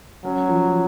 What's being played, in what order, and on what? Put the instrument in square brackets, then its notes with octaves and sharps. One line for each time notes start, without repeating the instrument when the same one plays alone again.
[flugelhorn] F#3 [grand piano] C#4
[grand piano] F3